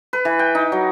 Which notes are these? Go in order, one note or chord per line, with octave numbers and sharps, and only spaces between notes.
B4
E3
G5
D#4
F#3